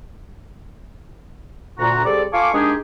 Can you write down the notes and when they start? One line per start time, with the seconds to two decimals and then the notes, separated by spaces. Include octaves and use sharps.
1.79 D2 A#2 F#4 A#5
2.05 G3 C4 G#4 A4 D5
2.33 F4 A4 F5 G#5 C#6 D6
2.53 G#3 A#3 D4 D#4 G4 G#4